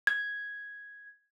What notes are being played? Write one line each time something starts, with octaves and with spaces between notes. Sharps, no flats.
G#6